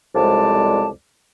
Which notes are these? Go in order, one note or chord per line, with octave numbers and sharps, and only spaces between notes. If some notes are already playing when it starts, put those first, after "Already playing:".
C2 F2 C#3 G#3 D5 A5